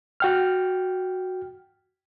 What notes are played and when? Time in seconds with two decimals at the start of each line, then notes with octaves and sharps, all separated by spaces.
0.20 F#4 G5 F6